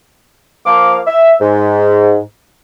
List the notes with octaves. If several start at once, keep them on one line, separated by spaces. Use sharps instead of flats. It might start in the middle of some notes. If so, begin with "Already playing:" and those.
F3 A#3 F5 D6
E5
G#2